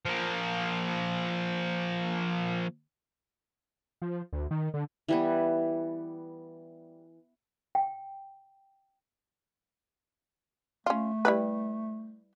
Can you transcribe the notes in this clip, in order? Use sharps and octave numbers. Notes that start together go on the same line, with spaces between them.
F3 A#3
F3
D2
D#3
D3
E3 G3 B3
G5
A3 C#4 F4
G3 E4 B4